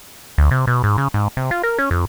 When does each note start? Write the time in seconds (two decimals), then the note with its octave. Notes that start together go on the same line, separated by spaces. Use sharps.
0.38 D2
0.51 C3
0.67 B2
0.84 G#2
0.98 C#3
1.14 G#2
1.37 C3
1.51 F4
1.63 A#4
1.79 C#4
1.91 F2